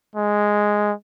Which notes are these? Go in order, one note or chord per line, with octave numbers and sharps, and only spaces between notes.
G#3